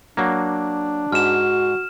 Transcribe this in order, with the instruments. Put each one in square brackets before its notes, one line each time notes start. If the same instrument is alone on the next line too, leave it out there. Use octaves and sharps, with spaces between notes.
[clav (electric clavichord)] F#3 A#3 [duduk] D4
[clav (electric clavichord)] G#2 [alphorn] F#4 [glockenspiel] F6 E7